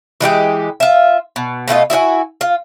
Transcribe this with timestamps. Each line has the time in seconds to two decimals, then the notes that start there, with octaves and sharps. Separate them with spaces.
0.21 E3 G#3 G4 G5
0.80 F4 E5
1.36 B2
1.68 B2 A3 F4 D#5
1.90 E4 F#4 D#5 G#5
2.41 F4